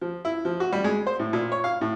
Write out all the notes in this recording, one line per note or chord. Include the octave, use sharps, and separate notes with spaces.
F3
E4
F3
F#4
G3
G#3
C5
A2
A#2
C#5
F5
A2